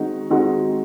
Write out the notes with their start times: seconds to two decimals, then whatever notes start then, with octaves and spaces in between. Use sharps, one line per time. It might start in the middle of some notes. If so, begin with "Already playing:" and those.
Already playing: D#3 G#3 C4 D#4 F#4
0.30 D#3 G#3 C4 D#4 F#4